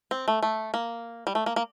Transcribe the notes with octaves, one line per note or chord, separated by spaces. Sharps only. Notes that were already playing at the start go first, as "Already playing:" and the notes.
C4
A3
A3
A#3
G3
A3
A#3
A#3